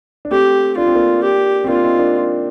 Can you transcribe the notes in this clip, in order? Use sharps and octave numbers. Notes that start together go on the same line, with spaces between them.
D4
A3 C4 G4
D4 F4
C4
A#3 D4
G4
C4
A#3 D4 F4
C4 D#4
A#3 D4